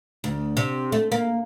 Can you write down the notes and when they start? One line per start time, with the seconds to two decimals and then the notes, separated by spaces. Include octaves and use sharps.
0.24 D2
0.57 C3
0.92 A3
1.12 A#3